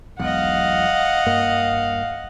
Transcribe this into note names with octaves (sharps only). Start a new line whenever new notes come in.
E1 B1 D#5 F5 F#5
G2 A#3